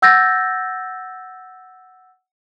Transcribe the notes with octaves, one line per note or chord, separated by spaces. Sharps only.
F#5 E6 G6 A6 A#6